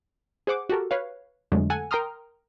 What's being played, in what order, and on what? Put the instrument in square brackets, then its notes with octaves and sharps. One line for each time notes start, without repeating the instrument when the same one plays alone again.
[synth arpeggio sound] G#4 C5 F#5 D6
F#4 G4 A4 A#4
B4 C#5 F5
F2 D3 F#3 G#3 A3
A4 F#5 G#5
A#4 G5 A#5 C6 D#6 F6